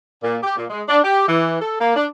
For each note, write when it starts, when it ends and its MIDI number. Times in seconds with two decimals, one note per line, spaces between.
0.24 0.38 46
0.43 0.54 67
0.57 0.65 46
0.70 0.82 56
0.89 1.00 62
1.04 1.26 67
1.28 1.56 52
1.61 1.76 69
1.81 1.95 58
1.96 2.07 62